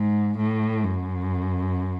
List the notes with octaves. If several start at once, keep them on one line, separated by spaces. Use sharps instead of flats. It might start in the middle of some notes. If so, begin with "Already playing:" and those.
Already playing: G#2
A2
F#2